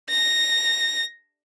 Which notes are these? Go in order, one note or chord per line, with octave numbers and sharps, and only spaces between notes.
A#6